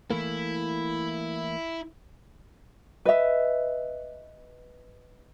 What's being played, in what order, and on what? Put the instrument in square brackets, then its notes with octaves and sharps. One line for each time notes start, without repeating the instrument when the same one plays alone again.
[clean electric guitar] E3 A3 A#3 [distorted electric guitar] E4
[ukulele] B4 D#5 E5